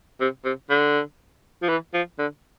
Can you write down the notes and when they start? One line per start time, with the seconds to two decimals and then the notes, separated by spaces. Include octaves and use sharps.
0.20 C3
0.45 C3
0.70 D3
1.62 F3
1.69 E3
1.94 F3
2.18 D3